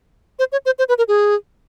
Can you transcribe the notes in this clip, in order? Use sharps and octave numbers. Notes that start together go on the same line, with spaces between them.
C5
C#5
C5
C5
B4
A#4
G#4